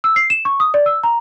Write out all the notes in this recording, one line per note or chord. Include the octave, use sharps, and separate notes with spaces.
E6
C7
E7
C#6
D#6
D5
E6
A#5